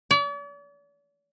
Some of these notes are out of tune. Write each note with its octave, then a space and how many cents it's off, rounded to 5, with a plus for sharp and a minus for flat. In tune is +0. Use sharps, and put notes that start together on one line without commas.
D5 -45